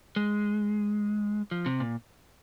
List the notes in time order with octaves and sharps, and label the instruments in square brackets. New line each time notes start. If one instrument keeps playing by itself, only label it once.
[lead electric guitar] G#3
F3
C3
A#2